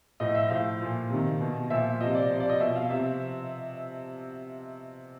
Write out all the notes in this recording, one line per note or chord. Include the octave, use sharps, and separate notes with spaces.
A2 F3 D#5
E5
A2 F3 F5
A#2 F3
C3 D#3
B2
A#2 F3 E5
C3 F3 D#5
D5
C3 F3
D5
D#5
B2 E5
F5
C3 F3 E5